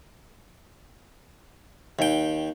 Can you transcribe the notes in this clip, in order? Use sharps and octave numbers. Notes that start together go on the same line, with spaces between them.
D#2 G5